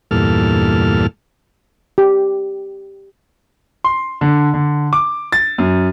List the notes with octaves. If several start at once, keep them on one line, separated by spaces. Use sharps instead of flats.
E2 G2 A#2 A4 F6
G4
C6
D3
D3
D6
A6
F#2